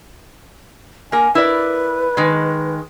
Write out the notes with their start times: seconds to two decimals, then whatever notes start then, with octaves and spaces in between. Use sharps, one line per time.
1.12 A#3 A#4 G#5
1.35 E4 A#4 B4 D5
2.17 D#3 G#3